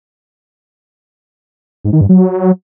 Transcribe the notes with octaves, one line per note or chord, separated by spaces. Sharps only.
G#2
D#3
G2
F#3